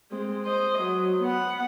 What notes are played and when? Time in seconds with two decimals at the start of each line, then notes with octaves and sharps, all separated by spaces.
0.11 G#3 C4
0.45 C5 D#5
0.82 F#3
1.22 B3 F#5